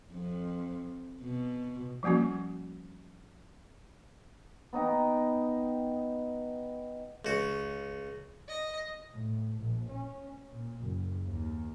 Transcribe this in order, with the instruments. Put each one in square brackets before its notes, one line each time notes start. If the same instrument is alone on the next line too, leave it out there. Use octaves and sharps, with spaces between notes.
[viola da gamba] F2
B2
[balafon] F3 G3 A#3 C#4 F#4
[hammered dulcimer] B3 D#4 D#5 G5
[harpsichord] C#2 F#4
[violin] D#5
[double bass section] A2
A#1
C#4
A#2
F#1
D#2